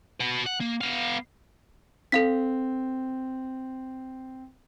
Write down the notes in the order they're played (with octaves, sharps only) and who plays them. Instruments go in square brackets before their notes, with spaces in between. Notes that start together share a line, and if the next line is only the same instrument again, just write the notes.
[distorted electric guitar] F#4 B4
F#5
A#3
B3 F5
[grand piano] C4 [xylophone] A4 F5 B6